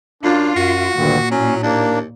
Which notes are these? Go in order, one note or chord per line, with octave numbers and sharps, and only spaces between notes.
F#2 D4 F4
F#2 F#4
D2 G2 A#2 D3 D#3
A2 F#3 C#4
D#2 A#3 D4